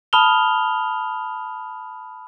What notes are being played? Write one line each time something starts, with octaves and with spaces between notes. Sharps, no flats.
A5 B5 D#6 F6 F7 G7